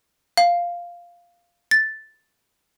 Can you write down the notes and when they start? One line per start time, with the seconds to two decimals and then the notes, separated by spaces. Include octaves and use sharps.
0.37 F5
1.71 A6